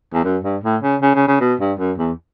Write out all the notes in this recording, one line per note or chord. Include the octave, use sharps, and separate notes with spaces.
E2
F#2
G2
A2
C#3
C#3
C#3
C#3
B2
G2
F#2
E2